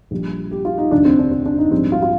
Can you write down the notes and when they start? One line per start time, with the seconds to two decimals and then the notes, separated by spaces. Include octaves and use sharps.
0.11 A#1 A#2 G3
0.51 G4
0.65 F4
0.78 D#4
0.91 F1 D#2 D3 D4
1.05 C4
1.19 D4
1.31 C4
1.46 D4
1.58 D#4
1.71 A#1 G#2 G3 C4
1.92 F4
2.02 F4